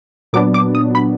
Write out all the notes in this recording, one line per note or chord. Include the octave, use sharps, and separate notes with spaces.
A#2 F#3 B3 D4 D6
D6
D#6
B5